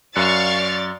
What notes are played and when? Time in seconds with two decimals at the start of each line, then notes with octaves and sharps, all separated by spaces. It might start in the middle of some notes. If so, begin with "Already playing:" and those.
0.16 F#2 D5 F5 C#6 F6 F#6 A6 C#7